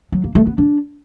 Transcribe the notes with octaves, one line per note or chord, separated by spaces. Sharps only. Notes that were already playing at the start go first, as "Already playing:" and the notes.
F#3
A#3
A3
B3
D4